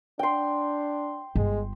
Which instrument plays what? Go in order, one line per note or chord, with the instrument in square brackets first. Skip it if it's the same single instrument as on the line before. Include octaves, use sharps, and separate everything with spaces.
[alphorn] D4 [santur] G5 C6
[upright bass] G1 [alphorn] G#3